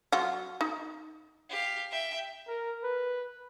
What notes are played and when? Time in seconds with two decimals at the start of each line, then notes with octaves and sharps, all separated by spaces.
0.12 F#3 F4 F#5
0.61 D#4
1.50 G4 F5
1.91 E5 G5
2.48 A#4
2.83 B4